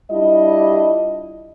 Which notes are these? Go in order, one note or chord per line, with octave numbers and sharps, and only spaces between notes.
G3 D4 E4 F4 D#5